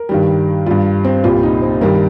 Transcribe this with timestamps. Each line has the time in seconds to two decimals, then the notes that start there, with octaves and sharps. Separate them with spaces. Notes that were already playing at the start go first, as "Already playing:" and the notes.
Already playing: A#4
0.09 G2 D#3 G3
0.66 G2 G3 F4
1.04 C4
1.24 C2 A#2 G3 F4
1.43 D#4
1.62 C4
1.81 G2 D#3 G3 A#4